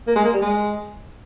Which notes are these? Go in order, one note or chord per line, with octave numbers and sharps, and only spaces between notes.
A#3
G#3
A#3
G3
G#3